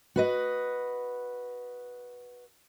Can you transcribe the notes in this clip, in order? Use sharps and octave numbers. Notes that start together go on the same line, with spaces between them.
F#4 B4 D#5